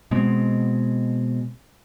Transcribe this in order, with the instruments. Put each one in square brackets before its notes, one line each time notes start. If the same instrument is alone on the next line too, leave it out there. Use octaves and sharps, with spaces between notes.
[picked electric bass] B2 G#3 C4